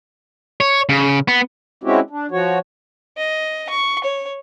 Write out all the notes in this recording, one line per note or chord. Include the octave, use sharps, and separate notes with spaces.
C#5
C#3
B3
G#3 C4 C#4 E4 F#4 G4
D4
F3 F#4 C#5
D#5
C#6
C#5